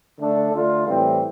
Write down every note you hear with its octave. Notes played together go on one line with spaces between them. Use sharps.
D3 A3 D4 A4
D3 A3 D4 F4
A2 E3 G3 C4